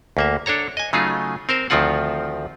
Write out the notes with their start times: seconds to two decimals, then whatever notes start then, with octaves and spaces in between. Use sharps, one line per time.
0.17 D2 A#3 E5
0.46 D4 A4 C#5 A#5
0.77 D#5 G#5
0.93 C#3 F#3 A3 D#4 F4 G#4
1.49 C4 A#4 C5
1.70 D2 D#3 F3 C4 F4 F#5